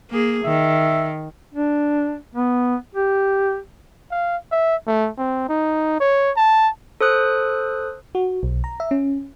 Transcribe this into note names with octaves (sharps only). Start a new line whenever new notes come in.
A#3 G#4
D#3 E5
D4
B3
G4
F5
E5
A3
C4
D#4
C#5
A5
A4 C5 D#6 F#6
F#4
B1
A#5
E5
C#4